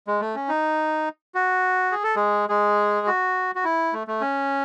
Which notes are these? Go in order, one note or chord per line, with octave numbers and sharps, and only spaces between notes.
G#3
A3
C#4
D#4
F#4
G#4
A4
G#3 G#4
G#3 G#4
F#4
F#4
E4
A3
A3
C#4